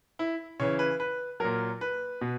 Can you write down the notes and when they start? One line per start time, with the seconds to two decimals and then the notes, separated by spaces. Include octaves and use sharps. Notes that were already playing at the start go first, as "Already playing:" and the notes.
0.19 E4
0.60 C#3 E3 C#5
0.79 B4
1.00 B4
1.40 A#2 F#3 A#4
1.81 B4
2.21 B2